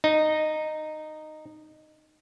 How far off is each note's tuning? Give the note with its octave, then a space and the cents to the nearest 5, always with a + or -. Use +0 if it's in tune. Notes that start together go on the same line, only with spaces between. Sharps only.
D#4 -10